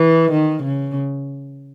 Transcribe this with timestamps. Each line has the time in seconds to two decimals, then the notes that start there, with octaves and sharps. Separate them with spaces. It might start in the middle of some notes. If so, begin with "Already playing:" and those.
Already playing: E3
0.32 D#3
0.63 C#3